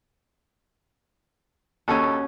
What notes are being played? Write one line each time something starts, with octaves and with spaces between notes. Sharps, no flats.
D#2 C#4 F#4 A4